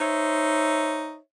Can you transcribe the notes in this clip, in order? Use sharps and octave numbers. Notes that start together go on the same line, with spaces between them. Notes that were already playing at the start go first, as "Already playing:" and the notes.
D#4 C5 C#5 E5